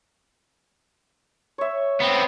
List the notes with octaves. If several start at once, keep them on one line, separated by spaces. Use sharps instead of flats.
C#5 E5
B3 C4